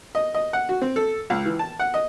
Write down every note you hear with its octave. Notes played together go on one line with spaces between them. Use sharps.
D#5
D#5
F#5
F#4
C4
A4
C#2
E3
A5
F#5
D#5